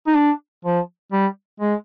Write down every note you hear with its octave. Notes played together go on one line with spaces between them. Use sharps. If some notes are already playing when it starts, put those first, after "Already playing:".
D#4
D4
F3
G3
G#3